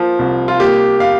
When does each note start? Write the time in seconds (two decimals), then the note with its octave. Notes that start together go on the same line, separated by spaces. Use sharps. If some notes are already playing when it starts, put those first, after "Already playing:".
Already playing: F3 A#3
0.19 C2
0.48 F4
0.60 A#3 G4
1.00 F5